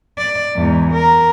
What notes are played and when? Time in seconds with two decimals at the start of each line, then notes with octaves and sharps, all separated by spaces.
0.18 D5
0.56 E2 G#2
0.92 A#4